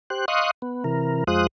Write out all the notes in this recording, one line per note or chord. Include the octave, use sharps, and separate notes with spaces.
G4 C5 F#6
D#5 F5 C6 C#6 D#6 F#6
B3
C3 E3 A#4
F2 G#3 F4 C5 D#6 F#6